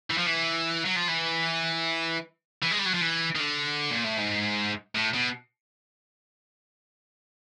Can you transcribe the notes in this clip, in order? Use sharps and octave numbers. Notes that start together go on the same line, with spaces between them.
E3
F3
E3
F#3
F3
E3
E3
G#3
G3
F#3
F3
E3
D#3
D3
A#2
A2
G#2
A2
B2